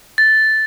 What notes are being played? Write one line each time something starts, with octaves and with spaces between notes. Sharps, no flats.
A6